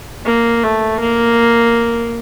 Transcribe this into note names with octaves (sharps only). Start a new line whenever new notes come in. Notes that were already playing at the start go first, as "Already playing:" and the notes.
A#3
A3
A#3